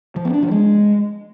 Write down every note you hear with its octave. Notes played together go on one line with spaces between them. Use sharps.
F3
B3
D4
F3
G#3